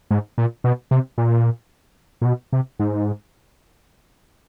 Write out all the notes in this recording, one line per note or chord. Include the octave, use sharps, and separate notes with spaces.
G#2
A#2
B2
C3
A#2
A#2
B2
C3
G#2